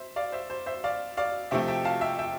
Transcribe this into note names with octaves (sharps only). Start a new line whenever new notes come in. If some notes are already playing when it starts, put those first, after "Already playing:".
Already playing: C5 E5
D5 F5
C5 E5
C5
C5 E5
D5 F5
D5 F5
C3 F3 A3 E5 G5
E5 G5
F5 A5
E5 G5
E5 G5